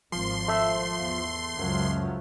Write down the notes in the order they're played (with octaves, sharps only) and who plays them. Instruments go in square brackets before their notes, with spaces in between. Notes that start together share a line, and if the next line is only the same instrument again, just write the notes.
[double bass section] G#1 [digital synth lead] F3 [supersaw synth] C6
[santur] A3 E5
[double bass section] E2
[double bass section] C#2 F3 F#3 [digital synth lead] F#2